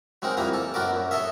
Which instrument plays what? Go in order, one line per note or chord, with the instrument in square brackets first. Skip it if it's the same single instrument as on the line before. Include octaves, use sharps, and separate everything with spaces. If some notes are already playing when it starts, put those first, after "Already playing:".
[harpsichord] F#3 G#3 C4 D#4 A#4
F2 E3 G3 A#3 A#5
A4
F#2 B3 F#4 A#4 D5 D6
F#2
A4 C#5 D#5 E5